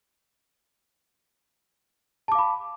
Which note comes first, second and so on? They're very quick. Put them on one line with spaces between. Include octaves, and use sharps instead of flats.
A5 D6 F5 B5